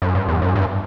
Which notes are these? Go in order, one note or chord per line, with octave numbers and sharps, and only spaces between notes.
F#2
G2
E2
F#2
G2